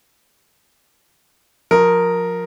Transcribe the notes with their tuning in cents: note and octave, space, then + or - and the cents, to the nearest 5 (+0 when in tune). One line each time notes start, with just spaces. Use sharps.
F3 +30 A#4 +0